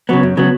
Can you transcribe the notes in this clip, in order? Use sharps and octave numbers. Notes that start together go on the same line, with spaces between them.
C#3 F#3 B3
F#2
C#3 F#3 B3